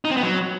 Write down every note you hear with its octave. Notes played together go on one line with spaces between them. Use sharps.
D#4
C4
B3
F#3